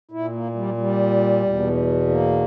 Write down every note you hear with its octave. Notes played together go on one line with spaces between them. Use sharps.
A#2 E4
A#3
G3
G3
E2 B2
A#3